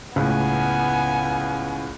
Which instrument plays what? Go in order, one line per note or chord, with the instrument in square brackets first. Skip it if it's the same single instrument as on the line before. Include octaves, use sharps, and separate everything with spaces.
[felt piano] C#2 A2 [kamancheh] B3 G#5